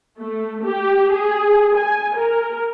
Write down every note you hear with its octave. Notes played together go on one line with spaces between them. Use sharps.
A3
G4
G#4
G#5
A#4